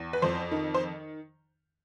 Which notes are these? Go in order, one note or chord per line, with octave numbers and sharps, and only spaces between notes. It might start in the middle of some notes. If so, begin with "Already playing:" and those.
Already playing: E2
B4
F2 C5
D#3
C5